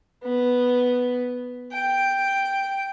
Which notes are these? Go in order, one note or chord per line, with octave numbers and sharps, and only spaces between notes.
B3
G5